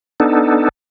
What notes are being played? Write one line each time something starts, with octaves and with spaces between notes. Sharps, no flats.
B3 D4 D#4 A4